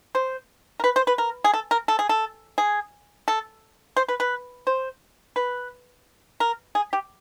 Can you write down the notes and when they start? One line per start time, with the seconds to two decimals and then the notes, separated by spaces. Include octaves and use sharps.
0.15 C5
0.80 A#4
0.84 B4
0.96 C5
1.07 B4
1.18 A#4
1.44 G#4
1.54 A4
1.71 A#4
1.88 A4
1.99 G#4
2.09 A4
2.58 G#4
3.28 A4
3.97 C5
4.08 B4
4.20 B4
4.67 C5
5.36 B4
6.40 A#4
6.75 G#4
6.93 G4